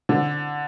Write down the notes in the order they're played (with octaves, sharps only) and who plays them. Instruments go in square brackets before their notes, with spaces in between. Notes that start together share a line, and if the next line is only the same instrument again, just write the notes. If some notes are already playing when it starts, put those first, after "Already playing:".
[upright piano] D3